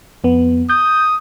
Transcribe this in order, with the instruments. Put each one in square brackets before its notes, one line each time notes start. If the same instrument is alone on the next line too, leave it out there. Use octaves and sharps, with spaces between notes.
[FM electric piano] F2 B3
[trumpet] D#6 [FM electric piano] G6